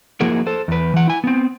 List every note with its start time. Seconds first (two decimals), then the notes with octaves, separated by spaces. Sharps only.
0.21 F3 A#3 E4 F#4 G#4 A#4
0.47 A4 C5
0.68 E2 B4
0.94 E3 F#5
1.08 E4 G#5
1.24 B3 C4